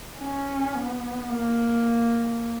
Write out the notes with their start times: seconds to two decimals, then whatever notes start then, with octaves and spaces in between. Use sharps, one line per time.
0.19 C#4
0.75 B3
1.29 A#3